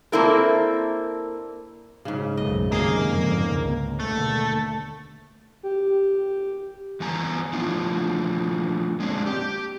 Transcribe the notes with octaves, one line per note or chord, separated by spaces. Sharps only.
A#3 C4 D4 E4 A4 A#4
G#2 C#3
B1 F#2 A3 D#5
F#2 C3 D#3 A#3 G#4 D#5 F5
F2 G#2 D3
C#2
D#2 B2 D3 A3
G4
G2 E3 B3 G#5 A#5
F3 A3 D4 E4 F4
G#3 A#3 C4 D4
G4